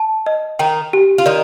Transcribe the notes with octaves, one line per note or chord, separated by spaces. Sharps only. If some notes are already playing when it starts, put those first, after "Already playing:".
Already playing: A5
D#5
D#3 D#4 G5
G4
F4
D#3 D#4 D5